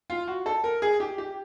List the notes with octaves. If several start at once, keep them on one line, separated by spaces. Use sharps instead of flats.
F4
F#4
A4
A#4
G#4
G4
G4